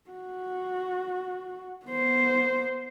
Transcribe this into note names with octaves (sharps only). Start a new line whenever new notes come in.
F#4
B3 C5